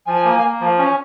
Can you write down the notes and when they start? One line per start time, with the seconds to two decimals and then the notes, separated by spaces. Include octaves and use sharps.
0.06 F3 G#5
0.25 A#3
0.43 A#3
0.61 F3
0.78 C#4